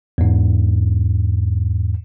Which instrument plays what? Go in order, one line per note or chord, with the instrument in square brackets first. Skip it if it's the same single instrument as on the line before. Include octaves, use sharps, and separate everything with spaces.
[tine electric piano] E2 G#2